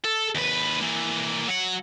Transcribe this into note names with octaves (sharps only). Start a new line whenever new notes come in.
A4
D#2 B4
E3 A#3
F#3 F#5